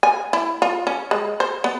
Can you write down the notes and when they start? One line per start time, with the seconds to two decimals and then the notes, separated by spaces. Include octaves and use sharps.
0.03 G#5
0.33 E4
0.62 F4
0.87 C#4
1.11 G#3
1.40 C5
1.64 B3